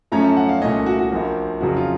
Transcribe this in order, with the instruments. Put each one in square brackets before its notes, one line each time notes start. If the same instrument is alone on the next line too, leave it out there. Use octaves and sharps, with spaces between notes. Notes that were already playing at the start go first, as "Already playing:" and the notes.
[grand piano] F#2 F3 A3 C#4 A#5
A5
F#5
F5
C2 A#2 A3 C#4 D#5
F#4
F#4
A#1 A#2 F3 A#3
F#1 F2 C#3 F#3 F#4
F4